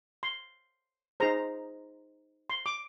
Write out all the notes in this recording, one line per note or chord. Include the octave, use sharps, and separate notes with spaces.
C6
D#4 G#4 C5 A#5
C6
D6